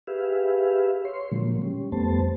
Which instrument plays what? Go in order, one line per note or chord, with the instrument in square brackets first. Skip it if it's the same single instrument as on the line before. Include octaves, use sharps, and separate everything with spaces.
[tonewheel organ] G4 G#4 B4 E5 F5
C#5 C6
A#2 D3 F3 F#3 G#3 A#3
G3 C#4
F2 G3 A3 B3 C5 A5